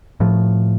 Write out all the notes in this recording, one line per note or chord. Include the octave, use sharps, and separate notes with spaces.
A2 F3